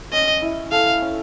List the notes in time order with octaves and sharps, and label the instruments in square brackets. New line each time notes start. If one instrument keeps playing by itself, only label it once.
[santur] C#4 [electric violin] D#5
[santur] E4
[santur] A4 [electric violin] F5
[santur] C#4